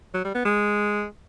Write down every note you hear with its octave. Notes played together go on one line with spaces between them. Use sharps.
F#3
G3
B3
G#3